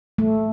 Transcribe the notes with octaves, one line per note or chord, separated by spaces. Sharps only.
A3